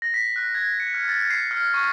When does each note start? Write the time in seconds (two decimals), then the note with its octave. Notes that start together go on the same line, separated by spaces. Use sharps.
0.02 A#6
0.14 B6
0.36 F#6
0.55 G#6
0.80 C#7
0.94 F6
1.09 A6
1.30 C7
1.51 F6
1.74 C#6